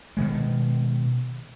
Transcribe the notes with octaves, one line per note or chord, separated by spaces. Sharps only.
B2 D#3 G#3